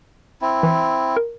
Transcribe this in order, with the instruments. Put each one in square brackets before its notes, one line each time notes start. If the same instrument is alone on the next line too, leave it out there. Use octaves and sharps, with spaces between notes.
[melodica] C4 E4
[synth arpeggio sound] E3
A#4